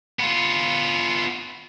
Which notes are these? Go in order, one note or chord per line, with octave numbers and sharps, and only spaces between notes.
B3 F4